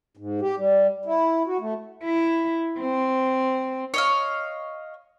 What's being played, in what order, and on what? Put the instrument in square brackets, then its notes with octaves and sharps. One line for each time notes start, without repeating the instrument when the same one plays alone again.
[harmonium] G#2
G4
G3
E4
F#4
A3
[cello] E4
C4
[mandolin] C#5 D#5 F5